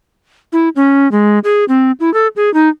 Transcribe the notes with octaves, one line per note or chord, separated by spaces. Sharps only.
E4
C#4
G#3
G#4
C4
E4
A4
G#4
D#4